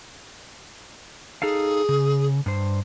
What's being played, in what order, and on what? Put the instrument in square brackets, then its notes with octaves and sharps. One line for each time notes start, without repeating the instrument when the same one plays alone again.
[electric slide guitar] D#4 A4 F5 [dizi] G#4
[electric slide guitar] C#3
G2 C5